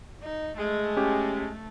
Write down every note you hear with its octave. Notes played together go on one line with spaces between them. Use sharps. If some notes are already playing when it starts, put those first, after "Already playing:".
D#4
G#3 A3
C#4 G4